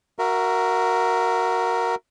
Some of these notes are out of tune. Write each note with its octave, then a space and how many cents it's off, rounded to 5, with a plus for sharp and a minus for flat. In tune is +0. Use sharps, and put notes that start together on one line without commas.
F#4 +0 A#4 +0 E5 +30